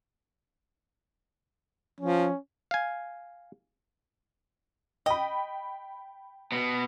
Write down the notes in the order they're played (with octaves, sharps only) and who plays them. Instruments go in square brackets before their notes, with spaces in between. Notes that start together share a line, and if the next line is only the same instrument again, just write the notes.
[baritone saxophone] F3 [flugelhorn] C#4
[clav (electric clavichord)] F5 G#5
[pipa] D#5 [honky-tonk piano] G5 B5
[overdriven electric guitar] B2